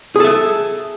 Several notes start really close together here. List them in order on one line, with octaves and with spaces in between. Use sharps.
G#4 A4 E5